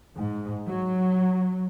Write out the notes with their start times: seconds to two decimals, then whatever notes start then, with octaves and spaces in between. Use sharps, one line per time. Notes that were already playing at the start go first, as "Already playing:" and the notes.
0.15 G#2
0.68 F#3